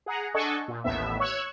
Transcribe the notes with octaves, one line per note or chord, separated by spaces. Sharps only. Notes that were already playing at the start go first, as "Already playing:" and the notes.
G#4 F#5 A#5
D4 A4 D#5 F#5 G#5 C#6
A#2
A1 D#2 A2 B3 E5
C#5 C#6 E6 F#6 G#6